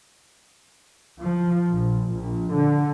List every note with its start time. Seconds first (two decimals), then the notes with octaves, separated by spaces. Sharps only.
1.19 F3
1.70 A#1
2.12 A#1
2.53 D3